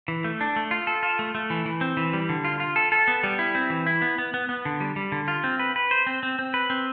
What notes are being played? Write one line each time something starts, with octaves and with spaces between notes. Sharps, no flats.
E3
A3
D4
A3
F4
A4
F4
A3
A3
E3
E3
C4
E3
G3
D3
F4
F4
A4
A4
B3
G3
E4
C4
E3
E4
B3
B3
B3
B3
D3
G3
G3
D3
F4
C4
B4
B4
C5
C4
C4
C4
B4
C4